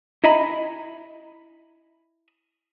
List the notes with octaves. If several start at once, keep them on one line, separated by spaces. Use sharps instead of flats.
E4 D#5 E5 G#5 A#5 B5